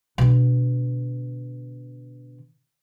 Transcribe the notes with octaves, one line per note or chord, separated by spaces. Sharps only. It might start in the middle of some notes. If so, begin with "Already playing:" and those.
B2 D3